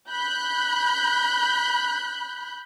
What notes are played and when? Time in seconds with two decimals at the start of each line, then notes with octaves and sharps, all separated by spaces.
0.10 B5 F#6 G6